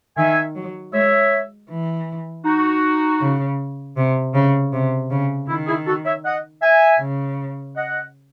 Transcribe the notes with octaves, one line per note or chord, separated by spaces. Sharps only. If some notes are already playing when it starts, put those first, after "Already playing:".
D#3 E5 G#5
F#3
G#3 C#5 E5
E3
D#4 F#4
C#3
C3
C#3
C3
C#3
D#3 E4
E4 G#4
F#4 A4
C#5 E5
D#5 F#5
E5 G#5
C#3
D#5 F#5